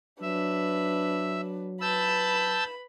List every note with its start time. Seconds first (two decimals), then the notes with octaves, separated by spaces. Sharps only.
0.22 F#3 D4 B4 E5
1.81 B4 A5 B5 E6 G6